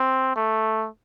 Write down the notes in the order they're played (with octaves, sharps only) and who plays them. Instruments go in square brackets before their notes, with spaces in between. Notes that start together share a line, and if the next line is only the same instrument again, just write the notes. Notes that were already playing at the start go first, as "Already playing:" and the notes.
Already playing: [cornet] C4
A3